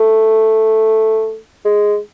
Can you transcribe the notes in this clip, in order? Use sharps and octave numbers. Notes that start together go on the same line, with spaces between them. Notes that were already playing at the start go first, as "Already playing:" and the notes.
Already playing: A3
G#3